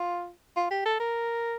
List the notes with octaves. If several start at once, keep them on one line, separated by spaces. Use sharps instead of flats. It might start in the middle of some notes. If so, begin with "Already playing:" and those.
Already playing: F4
F4
G4
A4
A#4